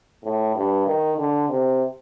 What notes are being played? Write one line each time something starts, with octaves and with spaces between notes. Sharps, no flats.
A2
G2
D#3
D3
C3